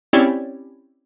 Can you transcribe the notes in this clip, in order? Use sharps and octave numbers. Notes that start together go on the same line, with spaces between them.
C4 C#4 E4 G4 C#5 D5